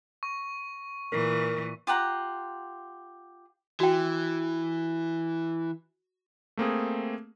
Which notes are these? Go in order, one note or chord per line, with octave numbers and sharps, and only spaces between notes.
C#6
A#2 E3 A#4 C7
F4 G4 F#5 A#5
E3 F#4 G5
A3 A#3 C4 G#4